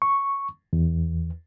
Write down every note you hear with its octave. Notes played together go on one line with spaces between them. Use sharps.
C#6
E2